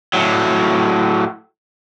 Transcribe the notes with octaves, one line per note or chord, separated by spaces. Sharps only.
A2 F#3